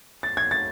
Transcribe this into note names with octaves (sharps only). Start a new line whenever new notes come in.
A6
G#6
A6